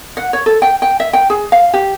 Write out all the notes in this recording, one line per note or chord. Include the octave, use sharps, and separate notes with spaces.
F#5
C#5
A4
G5
G5
E5
G5
G#4
F5
G4